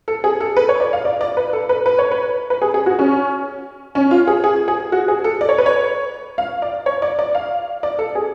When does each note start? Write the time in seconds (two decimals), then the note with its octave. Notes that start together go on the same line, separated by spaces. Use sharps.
0.08 A4
0.24 G#4
0.40 A4
0.57 B4
0.69 C#5
0.80 D5
0.93 F5
1.05 D5
1.21 D5
1.37 B4
1.53 A4
1.69 B4
1.86 B4
1.99 C#5
2.11 B4
2.50 B4
2.62 G#4
2.74 G#4
2.86 F#4
2.99 C#4
3.95 C#4
4.11 F4
4.27 G#4
4.44 G#4
4.68 G#4
4.92 F#4
5.08 G#4
5.24 A4
5.41 D5
5.49 C#5
5.58 B4
5.66 C#5
6.38 F5
6.62 D5
6.86 C#5
7.02 D5
7.19 D5
7.35 F5
7.83 D5
7.99 A4
8.15 G#4